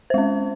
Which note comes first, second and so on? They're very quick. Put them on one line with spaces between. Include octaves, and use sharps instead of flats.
C5 G#3 C#4